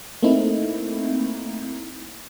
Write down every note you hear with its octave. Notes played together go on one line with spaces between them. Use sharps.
A3 A#3 C4 D#4 E4